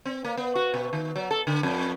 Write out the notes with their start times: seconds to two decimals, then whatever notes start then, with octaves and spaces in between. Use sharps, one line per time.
0.05 C4
0.24 A#3
0.37 B3
0.55 F#4
0.74 B2
0.93 D#3
1.16 F#3
1.31 A4
1.47 D3
1.63 F2